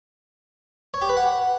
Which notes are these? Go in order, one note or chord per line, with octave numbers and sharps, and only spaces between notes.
C#5
G4
B4
F#5